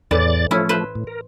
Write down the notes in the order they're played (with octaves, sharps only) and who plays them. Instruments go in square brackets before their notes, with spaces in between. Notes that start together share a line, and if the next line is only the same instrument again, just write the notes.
[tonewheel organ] E2 D5 A6 [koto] A2 E3
[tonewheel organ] F3 A3 [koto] C#4 E4
[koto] B4 C5
[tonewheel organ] A2
A#4